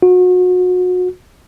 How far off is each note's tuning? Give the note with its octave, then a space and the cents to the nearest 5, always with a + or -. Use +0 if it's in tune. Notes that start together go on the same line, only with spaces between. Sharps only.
F#4 -30